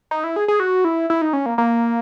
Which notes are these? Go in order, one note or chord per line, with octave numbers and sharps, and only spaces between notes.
D#4
E4
G#4
G#4
F#4
E4
E4
D#4
C#4
A#3
A#3